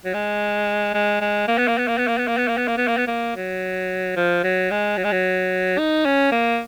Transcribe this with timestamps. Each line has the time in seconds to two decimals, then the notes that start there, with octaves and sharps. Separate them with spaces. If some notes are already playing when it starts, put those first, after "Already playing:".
0.05 F#3
0.14 G#3
0.94 G#3
1.21 G#3
1.48 A#3
1.58 B3
1.68 A#3
1.78 B3
1.88 A#3
1.98 B3
2.07 A#3
2.18 B3
2.28 A#3
2.38 B3
2.48 A#3
2.57 B3
2.68 A#3
2.77 B3
2.88 A#3
2.97 B3
3.07 A#3
3.36 F#3
4.16 F3
4.44 F#3
4.71 G#3
4.97 F#3
5.05 G#3
5.12 F#3
5.79 D#4
6.05 C#4
6.32 A#3